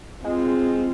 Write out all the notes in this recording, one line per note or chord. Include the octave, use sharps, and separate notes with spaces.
G#3 C4 F4